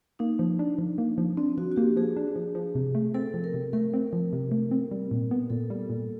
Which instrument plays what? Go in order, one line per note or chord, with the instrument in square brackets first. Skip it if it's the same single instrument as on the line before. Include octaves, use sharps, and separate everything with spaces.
[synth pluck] A#3 [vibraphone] D#4
[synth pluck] F3
D4
F3
A#3
F3
[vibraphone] C4 [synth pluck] D4
[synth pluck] F3 [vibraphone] F#4
[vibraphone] F#4
[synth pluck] A#3 [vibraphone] G4
[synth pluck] F3 [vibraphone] G#4
[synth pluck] D4
F3
F3
C3
A3
[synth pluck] C4 [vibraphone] A4
[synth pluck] F3
[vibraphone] A#4
[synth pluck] C3
[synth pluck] A3 [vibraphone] A#4
[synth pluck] C4
F3
C3
A3
C4
G3
A#2
B3
[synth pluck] A#2 [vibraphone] A4
[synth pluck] G3
A#2